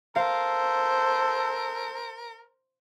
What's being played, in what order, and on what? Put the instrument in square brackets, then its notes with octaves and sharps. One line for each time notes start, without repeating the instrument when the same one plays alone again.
[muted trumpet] A4 [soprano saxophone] A#4 [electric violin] C5 [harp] F5